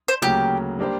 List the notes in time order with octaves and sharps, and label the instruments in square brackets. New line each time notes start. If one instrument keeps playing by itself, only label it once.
[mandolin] C5
[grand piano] D2 C#3 F#3 A#3 [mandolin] G4
[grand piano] G3 A#3 D4 G4 C5